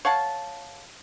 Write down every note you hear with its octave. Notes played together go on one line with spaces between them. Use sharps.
C#5 F5 F#5 A5